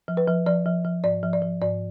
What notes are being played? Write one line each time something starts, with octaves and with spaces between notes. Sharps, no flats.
F3
B4
F3
F3 D5
F3
F3
G#2 D5
F3
D5
F3
G#2 D5